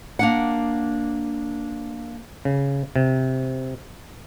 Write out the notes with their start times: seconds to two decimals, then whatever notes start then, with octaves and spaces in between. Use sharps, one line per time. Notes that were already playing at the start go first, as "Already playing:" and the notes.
0.19 A#3 D4 F#5
2.45 C#3
2.96 C3